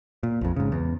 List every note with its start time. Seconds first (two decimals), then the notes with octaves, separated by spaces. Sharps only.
0.23 A#2
0.41 A#1 F2
0.56 G#2 C#3
0.72 E2